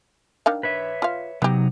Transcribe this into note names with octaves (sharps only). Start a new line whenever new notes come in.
D#3 D4 F5
B4 C#5 E5
F4 F5
C3 F#3 B3 D#4 G4